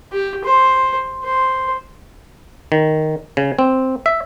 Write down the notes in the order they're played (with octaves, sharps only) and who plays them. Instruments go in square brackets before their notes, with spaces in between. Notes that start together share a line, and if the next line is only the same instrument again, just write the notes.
[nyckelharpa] G4
C5
C5
[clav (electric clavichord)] D#3
C#3
C4
E5